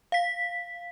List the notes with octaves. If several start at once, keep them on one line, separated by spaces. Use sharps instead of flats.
F5 B6